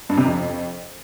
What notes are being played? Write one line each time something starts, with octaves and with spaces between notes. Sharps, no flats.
G2
C3
F2